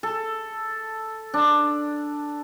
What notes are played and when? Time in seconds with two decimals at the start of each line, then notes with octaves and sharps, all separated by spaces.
0.03 A4
1.34 D4